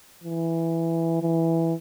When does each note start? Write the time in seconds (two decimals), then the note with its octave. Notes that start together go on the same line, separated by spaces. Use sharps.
0.24 E3
1.22 E3